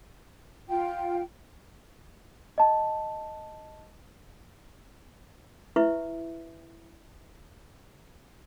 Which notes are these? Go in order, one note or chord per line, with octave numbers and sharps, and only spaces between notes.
F4 G5
D#5 A5
E4 B4 E5 C#6